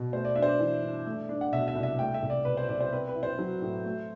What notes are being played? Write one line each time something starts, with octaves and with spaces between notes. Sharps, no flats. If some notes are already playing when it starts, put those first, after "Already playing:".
Already playing: B2
A3 C5
D5
D4 E5
C5
D5
E3
G2
A3
D4
F#5
B2 E5
E5
C2
E5
A3 G5
E5
C2
D5
B2 B4
C5
C2 D5
C5
C4 B4
B4
E4
C5
F#3
A2
A3